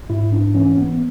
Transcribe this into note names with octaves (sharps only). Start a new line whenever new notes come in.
G#2 E4
D4
E3 C#4
B3